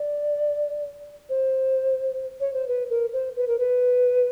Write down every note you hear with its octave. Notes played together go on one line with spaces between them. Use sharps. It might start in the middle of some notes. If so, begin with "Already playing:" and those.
Already playing: D5
C5
C#5
C5
B4
A#4
C5
B4
A#4
B4